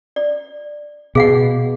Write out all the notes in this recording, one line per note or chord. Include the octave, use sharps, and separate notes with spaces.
D5
B2 G#4 F5 F#5